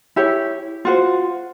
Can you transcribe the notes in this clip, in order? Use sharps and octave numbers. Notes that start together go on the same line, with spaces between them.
E4 G4 C#5
F4 F#4 C5